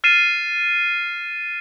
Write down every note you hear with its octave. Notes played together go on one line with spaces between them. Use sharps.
F6 A6 C7 D#7 E7